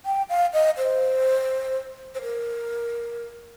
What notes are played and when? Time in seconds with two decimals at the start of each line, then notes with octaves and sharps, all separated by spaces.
0.06 G5
0.30 F5
0.53 D#5
0.77 C5
2.15 C5
2.22 A#4